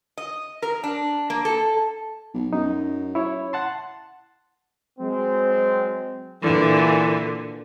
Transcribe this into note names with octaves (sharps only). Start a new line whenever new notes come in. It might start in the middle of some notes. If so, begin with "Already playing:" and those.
D#5
A#4
D4
A#3
A4
B1
F#2 D#4
E4 C#5
F#5 A5 C6
F#3 G#3 C4
A#2 D3 E3